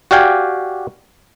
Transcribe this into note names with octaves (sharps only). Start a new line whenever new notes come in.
F#4 G4 D5 F5 G5 G#5